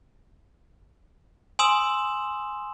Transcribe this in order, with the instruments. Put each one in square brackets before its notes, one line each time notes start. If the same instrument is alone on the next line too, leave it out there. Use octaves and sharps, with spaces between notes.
[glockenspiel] G#5 C6 D#6 E6 E7 F#7